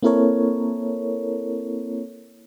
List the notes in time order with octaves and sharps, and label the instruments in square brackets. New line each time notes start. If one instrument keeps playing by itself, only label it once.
[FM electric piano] A#3 C4 E4 A4 A#4 C#5